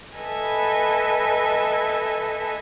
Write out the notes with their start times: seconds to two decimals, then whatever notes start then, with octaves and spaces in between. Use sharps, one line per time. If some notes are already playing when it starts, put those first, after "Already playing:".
0.17 A4 B4 D#5 E5 G#5 A5